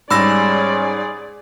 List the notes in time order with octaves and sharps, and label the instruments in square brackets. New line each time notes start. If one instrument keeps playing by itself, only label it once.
[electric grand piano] G#2 G3 [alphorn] C#4 [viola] G#4 D5 [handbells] B5 E6 A#6